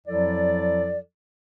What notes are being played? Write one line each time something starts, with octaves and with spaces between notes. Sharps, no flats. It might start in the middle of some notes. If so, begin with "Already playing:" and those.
F2 F3 F#3 E4 A4 D5